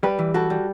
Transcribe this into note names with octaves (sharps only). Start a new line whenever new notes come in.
G3 G4 B4
E3
G3 F#4 A4
G3